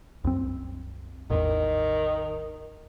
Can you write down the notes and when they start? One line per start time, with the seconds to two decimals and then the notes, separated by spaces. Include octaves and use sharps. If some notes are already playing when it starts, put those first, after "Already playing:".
0.24 C2 F#2 C4
1.30 A1 E2 D#3